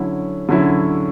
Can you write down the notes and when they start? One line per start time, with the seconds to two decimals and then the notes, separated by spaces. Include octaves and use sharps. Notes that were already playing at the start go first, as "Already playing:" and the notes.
Already playing: D3 F#3 C#4 E4
0.49 D3 F#3 C#4 E4